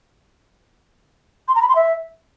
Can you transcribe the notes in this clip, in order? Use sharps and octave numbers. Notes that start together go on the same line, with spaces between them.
C6
A#5
B5
C6
E5